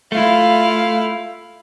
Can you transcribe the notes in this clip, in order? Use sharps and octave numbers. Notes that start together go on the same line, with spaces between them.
A3 E4 F4 F5